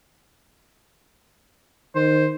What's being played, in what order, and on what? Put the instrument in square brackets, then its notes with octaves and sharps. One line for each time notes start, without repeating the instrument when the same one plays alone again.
[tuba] D#3 [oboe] C5